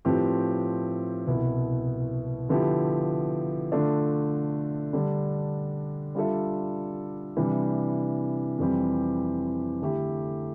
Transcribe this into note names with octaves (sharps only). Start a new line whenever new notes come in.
A2 F3 C4 G4 B4
C2 B2 B3 E4
D3 F3 B3 E4 G4
D3 A3 D4 F4
D3 G3 D4
G3 D4 F4 A4 E5
C3 E3 G3 D4
F2 E3 G3 C4 G4
D3 A3 E4 G4